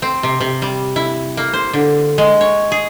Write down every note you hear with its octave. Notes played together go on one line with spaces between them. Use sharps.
C4
C3
C3
G3
E4
A#3
C5
D3
G#3
C#5
G#4